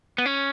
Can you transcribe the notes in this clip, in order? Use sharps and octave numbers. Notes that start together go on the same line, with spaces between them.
B3
C#4